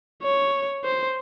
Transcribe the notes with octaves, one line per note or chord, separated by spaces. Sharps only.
C#5
C5